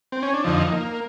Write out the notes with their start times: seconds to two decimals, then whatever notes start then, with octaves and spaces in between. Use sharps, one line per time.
0.12 C4
0.23 C#4
0.34 D4
0.44 F2 D3 F3 D#4
0.72 A#3